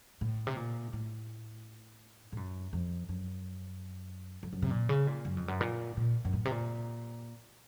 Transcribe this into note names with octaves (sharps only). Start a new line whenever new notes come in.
A2
C3
A#2
A2
A2
F#2
F2
F#2
F2
F#2
C3
A#2
C#3
A#2
F#2
F2
F#2
A#2
A#2
F#2
A2
C3
A#2